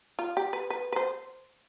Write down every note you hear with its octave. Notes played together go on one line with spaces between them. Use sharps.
F4
G4
B4
B4
B4
C5